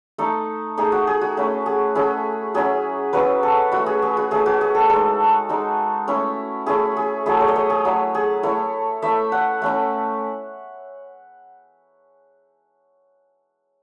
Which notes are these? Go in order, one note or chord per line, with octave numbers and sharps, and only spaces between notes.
A3 D#4 A4
A3 D#4 G#4
F#4
G#4
F#4
A3 C#4 E4
G#4
A3 C#4 E4 G#4
F#3 C#4 E4 G#4
F#3 C#4 E4 B4
A4
A3 E4 F#4
G#4
G#4
F#4
A3 E4 G#4
F#4
G#4
A4
G#3 D#4 A4
G#3 D#4
A3 C#4 E4
A3 C#4 E4 G#4
G#4
F#3 A3 E4 G#4
C#5
D#5
C#5
G#4
F#3 A3 E4
G#4
A3 E4 C#5
A3 E4 E5
F#5
A3 C#4 E4